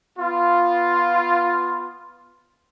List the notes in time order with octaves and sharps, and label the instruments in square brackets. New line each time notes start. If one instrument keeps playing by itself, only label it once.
[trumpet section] B3 F4